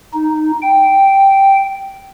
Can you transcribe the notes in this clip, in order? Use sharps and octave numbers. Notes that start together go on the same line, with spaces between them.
D#4
G5